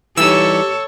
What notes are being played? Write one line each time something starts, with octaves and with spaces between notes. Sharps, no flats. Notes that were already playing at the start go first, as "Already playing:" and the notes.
E3 G3 D#4 G4 A4 C#5 E6